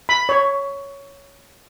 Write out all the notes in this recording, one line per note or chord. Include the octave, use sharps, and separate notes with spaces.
B5
C#5